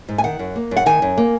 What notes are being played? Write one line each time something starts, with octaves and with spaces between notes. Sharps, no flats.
G#2
G#5
D#3 F#5
F#2
A#3
F#2
F#5
D#3 G#5
F#2
A#3